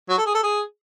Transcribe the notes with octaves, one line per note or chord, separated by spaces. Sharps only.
F#3
A4
G#4
A4
G#4